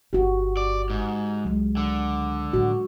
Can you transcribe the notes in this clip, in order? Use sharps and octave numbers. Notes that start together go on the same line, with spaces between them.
G1 F#4 G4
D5
G#2
C#2 F#3 G#3
D3
A2 F3 F#4